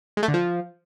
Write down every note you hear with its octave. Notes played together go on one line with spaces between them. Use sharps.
G#3
A3
D3
F3